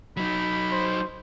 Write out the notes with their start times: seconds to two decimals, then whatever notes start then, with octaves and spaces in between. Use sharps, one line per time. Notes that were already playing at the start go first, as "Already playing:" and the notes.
0.17 F#3 D#4 B5
0.72 C5